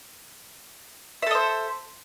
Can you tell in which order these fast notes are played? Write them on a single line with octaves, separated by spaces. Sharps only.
E5 A4 D#5 C5